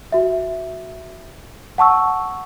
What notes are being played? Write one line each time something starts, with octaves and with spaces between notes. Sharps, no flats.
F#4 E5
F#5 A5 C#6 E6